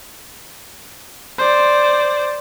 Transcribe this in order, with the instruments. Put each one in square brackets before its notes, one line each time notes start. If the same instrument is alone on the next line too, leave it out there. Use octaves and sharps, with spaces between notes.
[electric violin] C5 D5